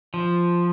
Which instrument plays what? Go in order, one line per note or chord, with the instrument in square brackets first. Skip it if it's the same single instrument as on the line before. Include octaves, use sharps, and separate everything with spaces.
[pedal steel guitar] F3